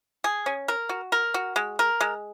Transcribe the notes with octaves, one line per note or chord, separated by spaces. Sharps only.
G#4
C#4
A#4
F#4
A#4
F#4
G#3
A#4
G#3